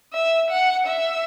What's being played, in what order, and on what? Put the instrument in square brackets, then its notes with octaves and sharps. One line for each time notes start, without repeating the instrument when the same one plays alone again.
[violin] E5
F#5
E5